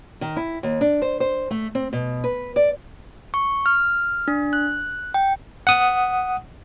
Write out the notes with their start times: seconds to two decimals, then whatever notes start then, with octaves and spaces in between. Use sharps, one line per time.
0.21 D#3
0.36 E4
0.63 D#2
0.81 D4
1.02 C5
1.20 C5
1.51 A3
1.75 C4
1.93 B2
2.24 B4
2.56 D5
3.34 C#6
3.66 F6
4.28 D4
4.53 F#6
5.14 G5
5.67 F#5 D#6